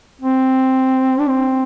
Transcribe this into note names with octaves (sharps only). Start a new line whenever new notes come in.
C4
D4
C4